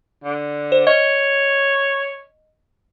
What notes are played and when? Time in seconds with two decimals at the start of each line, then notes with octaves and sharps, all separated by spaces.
0.24 D3
0.72 C5
0.87 C#5 D#5